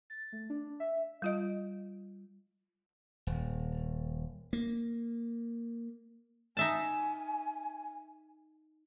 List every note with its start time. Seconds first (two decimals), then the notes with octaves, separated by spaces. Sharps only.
0.10 A6
0.32 A3
0.50 D4
0.80 E5
1.22 G3 F4 D#5
3.27 D#1
4.53 A#3
6.57 D#4 E5 G#5 A5